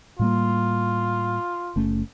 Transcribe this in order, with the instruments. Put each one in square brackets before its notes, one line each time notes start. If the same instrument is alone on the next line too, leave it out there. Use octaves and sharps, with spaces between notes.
[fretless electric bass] A2 G3 A#3 [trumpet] F4
[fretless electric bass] F#1 A3 C#4